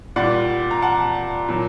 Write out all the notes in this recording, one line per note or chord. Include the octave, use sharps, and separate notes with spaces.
A#2 G3 D5 F#5
A#5
F#5 A5
A#2 F#3